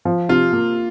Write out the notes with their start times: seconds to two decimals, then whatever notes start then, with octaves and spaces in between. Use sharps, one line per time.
0.05 F3
0.29 C3 F4
0.53 A#3